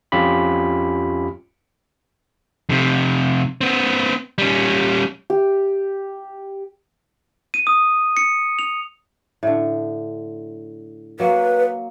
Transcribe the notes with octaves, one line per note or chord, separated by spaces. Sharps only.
F2 C#4 F4 G4 B5
F2 C3
B3 C4
G3 C#4
G4
D#7
D#6
C#7
F7
A2 D3
F#3 A#3 B4